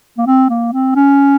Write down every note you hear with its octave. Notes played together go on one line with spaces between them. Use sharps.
A#3
C4
A#3
C4
C#4